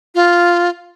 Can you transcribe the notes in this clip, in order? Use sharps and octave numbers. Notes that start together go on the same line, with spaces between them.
F4